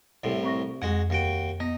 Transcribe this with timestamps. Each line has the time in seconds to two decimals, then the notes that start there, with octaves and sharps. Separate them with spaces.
0.24 C2 A2 C3
0.44 C4 C#6 A#6
0.82 F2 G#3 F#4 F#5
1.10 D#2 F#4 G5
1.60 B3 D#4